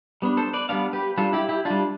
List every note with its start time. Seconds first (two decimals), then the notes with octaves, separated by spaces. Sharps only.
0.22 G3 B3 D4
0.37 A4 C5
0.53 B4 D5
0.69 G3 B3 D4 D5 F5
0.93 G4 B4
1.17 G3 D4 F4 A4
1.33 E4 G4
1.49 E4 G4
1.65 G3 D4 F4